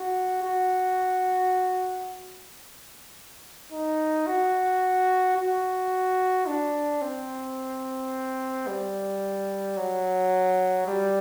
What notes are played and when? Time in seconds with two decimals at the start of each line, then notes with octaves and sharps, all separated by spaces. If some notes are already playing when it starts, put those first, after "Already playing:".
Already playing: F#4
0.43 F#4
3.72 D#4
4.27 F#4
5.37 F#4
6.46 D4
7.02 C4
8.67 G3
9.77 F#3
10.87 G3